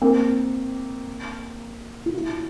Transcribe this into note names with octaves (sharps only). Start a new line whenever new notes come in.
A#3 C4
F4
E4 F#4